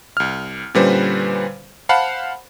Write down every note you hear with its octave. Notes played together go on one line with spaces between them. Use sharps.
C2 F6
A#2 D3 G3 C#4 B4 C5
C5 F5 F#5 A5 B5